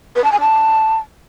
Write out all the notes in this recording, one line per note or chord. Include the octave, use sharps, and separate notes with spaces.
B4
A5
G#5
A5